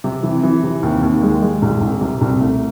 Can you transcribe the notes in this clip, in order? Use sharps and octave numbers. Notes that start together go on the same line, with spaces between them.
C3
E3
E3
C3
D#2
D#2
G#3
G#3
C2
C2
C3
C2
A3